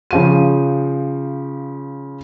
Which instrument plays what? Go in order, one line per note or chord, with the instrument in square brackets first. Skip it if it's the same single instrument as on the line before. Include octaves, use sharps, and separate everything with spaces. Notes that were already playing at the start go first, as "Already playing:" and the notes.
[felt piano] C#3 F3 D#7